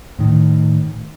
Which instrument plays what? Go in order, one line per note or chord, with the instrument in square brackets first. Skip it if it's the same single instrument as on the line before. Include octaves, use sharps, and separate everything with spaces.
[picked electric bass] A2 D#3